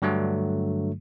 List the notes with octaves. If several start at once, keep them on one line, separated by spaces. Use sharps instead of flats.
G2 D3 F#3 A3